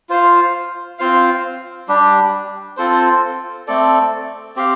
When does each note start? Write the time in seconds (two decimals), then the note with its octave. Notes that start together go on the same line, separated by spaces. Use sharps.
0.09 F4 C5 F5
0.99 C4 F4 C5 F5
1.88 G3 D4 G4
2.77 C4 F4 A4 C5
3.68 A3 C4 A4 D5
4.56 C4 G4 F5